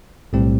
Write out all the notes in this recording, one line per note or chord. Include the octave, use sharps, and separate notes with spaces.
B1 A2 G3 C4 G4